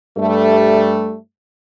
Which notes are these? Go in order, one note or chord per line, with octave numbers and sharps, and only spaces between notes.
G2 G3 A3